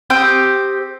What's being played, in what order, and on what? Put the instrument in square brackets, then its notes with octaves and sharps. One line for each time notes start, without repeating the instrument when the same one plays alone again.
[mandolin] C4 G4 D#6 G6